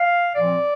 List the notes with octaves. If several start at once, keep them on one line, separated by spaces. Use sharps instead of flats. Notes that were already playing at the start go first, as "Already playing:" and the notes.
Already playing: F5
A#2 F3 C4 D5